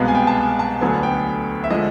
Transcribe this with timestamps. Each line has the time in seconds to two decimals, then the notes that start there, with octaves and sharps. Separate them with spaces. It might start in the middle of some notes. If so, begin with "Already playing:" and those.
Already playing: C2 B2 G#3 B3 F5
0.08 G#5
0.15 G5
0.27 A5
0.37 G#5
0.59 A5
0.81 D2 D3 F#3 B3 G#5
1.03 G5
1.64 E5
1.70 D3 F3 G#3 D#5